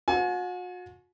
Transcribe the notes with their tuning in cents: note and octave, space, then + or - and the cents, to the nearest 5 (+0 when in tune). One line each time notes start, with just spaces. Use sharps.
F#4 -40 G#5 +40